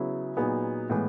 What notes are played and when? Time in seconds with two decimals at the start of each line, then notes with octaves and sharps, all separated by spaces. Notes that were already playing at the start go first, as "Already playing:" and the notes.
Already playing: C#3 F#3 B3 E4
0.37 A#2 F#3 B3 D#4 G#4
0.90 A2 E3 G#3 B3